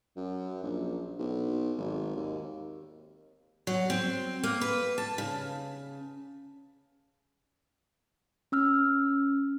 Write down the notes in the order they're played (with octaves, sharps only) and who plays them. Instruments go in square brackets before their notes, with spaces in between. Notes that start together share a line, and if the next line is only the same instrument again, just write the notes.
[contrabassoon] F#2
A#1
B1
G#1
D#2
[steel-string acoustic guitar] F#3
C4
A#3
B4
A5
C#3
[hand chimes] C#4 E6 F6